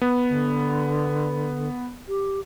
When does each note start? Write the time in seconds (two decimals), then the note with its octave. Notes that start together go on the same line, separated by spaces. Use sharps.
0.01 B3
0.29 D3
2.08 G4